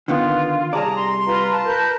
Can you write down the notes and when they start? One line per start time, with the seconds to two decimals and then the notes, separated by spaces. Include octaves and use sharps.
0.08 D3 D#3 B3 F4
0.73 C2 G#4 D5 A5 A#5
0.95 C6
1.26 F4 B4 A#5
1.51 A5
1.66 A#4 B4 G6